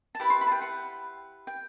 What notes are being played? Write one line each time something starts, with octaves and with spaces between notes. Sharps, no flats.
A5
E4 G4 B4 B5
C6
B5
A5
G5
F#5
G5